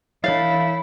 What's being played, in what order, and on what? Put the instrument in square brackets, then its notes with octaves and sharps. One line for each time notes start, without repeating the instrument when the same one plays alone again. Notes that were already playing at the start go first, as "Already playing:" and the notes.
[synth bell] E3 C#5 A6 [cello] E4 [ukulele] F5